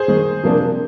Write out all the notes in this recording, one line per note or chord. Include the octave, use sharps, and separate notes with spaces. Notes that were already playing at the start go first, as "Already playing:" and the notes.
Already playing: G#4 C5
D#3 G#3 D#4
C3 F3 A#3 D4